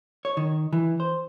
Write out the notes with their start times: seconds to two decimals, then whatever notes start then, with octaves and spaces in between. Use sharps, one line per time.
0.25 C#5
0.37 D#3
0.73 E3
1.00 C5